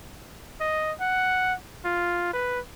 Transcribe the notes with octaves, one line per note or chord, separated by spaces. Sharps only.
D#5
F#5
F4
B4